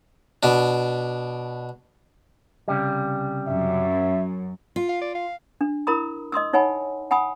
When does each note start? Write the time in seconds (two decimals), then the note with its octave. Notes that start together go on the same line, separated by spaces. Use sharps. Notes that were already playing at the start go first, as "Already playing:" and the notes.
0.43 B2 D4
2.68 C2 C#3 G3
3.47 F#2 E5
4.76 F4
4.89 F5
5.02 D5
5.15 F5
5.61 D4
5.87 E4 A#4 A#5 B5 D#6
6.32 D#5 C6 D#6 E6
6.53 D#4 C#5 F#5 G#5 B5
7.11 F#5 G#5 B5 D#6